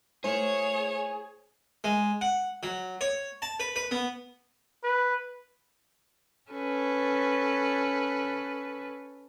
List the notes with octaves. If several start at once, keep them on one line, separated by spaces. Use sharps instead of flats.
A3 A#3 E4 G#4 C5 C#5 E7
G#3
F#5
F#3
C#5
A5
B4
B4
B3
B4
C#4 A4 B4